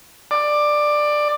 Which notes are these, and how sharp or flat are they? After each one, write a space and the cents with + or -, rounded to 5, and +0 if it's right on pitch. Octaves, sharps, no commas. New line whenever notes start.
D5 +15